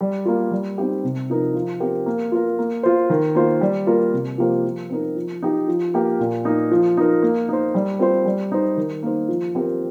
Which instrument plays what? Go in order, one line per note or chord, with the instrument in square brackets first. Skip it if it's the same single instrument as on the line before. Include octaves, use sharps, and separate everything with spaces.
[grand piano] G3
A#3 F4
G3
C4 D#4 G4
C3
F3 D#4 A#4
F3
C4 G4 A#4
A#3
F4 A#4
A#3
F4 C5
D#3
A#3 F4 C5
G3
A#3 F4 A#4
C3
F3 A#3 G4 C5
F3
C4 D#4 A#4
F3
D#4 G4
F3
A#3 G4 A#4
A#2
A#3 D#4
F3
D#4 A#4
A#3
D#4 C5
G3
C4 F4 C5
G3
D#4 C5
D#3
A#3 D#4 C5
F3
C4 G4 A#4